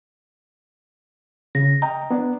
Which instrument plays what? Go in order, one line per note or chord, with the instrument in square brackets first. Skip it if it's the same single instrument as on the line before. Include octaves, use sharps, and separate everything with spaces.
[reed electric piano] C#3 [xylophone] A#6
[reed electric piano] D#5 G5 [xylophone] A#5
[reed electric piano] B3 D4